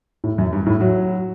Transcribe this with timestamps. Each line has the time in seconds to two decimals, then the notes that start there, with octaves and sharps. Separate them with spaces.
0.24 A2
0.38 F#2
0.53 G2
0.66 A2
0.81 F#3